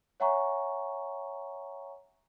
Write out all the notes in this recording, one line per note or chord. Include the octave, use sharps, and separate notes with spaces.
C#5 E5 F#5 G#5 A#5 C#6